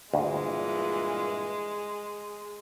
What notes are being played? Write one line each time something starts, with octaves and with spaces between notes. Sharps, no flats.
D2 G2 A#2 E3 G#3